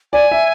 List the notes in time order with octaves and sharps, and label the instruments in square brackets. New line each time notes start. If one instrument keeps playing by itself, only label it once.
[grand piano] D5 [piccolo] G#5
[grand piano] E5